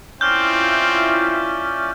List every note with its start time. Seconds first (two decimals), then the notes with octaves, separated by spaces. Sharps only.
0.21 C4 C#4 E4 F4 D5 E5 F6 G6